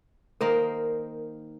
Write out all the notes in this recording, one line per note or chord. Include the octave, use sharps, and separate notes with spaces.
D#3 A#3 A#4 C5